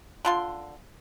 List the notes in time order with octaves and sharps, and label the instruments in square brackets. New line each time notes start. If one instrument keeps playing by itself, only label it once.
[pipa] D3 F4 C6